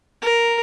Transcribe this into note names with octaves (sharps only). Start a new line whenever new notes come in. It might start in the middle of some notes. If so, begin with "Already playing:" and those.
A#4